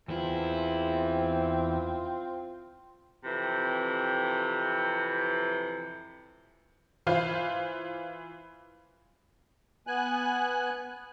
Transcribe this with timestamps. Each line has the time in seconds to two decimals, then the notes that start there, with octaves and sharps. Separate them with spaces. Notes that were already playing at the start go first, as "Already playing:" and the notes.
0.09 E2 C4 E4 F4
3.23 F2 C3 E3
7.07 E3 F4 C5 F5 C7
9.87 B3 G#5 F#6